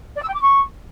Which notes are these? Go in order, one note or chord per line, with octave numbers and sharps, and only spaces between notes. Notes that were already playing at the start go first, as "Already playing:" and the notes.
D5
E6
G5
D6
C#6